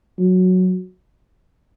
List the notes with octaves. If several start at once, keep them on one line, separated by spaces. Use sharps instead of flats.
F#3